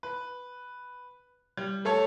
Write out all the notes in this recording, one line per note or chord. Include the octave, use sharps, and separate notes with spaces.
B4
G3
A3 A4 C#5